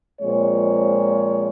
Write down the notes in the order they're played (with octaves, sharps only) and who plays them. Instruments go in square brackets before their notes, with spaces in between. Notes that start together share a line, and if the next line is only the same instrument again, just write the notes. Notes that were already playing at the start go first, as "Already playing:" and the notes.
[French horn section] A#2 F3 G#3 C4 C#5